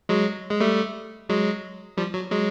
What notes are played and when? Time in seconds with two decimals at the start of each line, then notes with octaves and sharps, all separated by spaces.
0.09 F#3 G#3
0.51 G#3
0.60 G3 A3
1.29 F#3 G#3
1.97 F3 G3
2.14 F#3
2.32 F#3 G#3